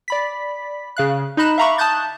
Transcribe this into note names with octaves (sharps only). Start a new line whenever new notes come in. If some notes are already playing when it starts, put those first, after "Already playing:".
D5 B5 B6
C#3 F5 F#6
D#4 D#5 B5 F#6 E7
E5 F5 A#5 B5 C#6 D6
A5 D#6 F#6 G6 A6